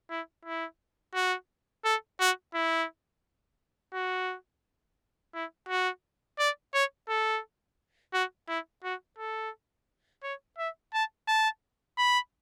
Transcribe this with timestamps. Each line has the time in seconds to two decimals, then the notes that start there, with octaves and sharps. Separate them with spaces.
0.11 E4
0.45 E4
1.15 F#4
1.85 A4
2.20 F#4
2.54 E4
3.94 F#4
5.35 E4
5.69 F#4
6.39 D5
6.74 C#5
7.09 A4
8.14 F#4
8.49 E4
8.84 F#4
9.18 A4
10.23 C#5
10.58 E5
10.94 A5
11.28 A5
11.98 B5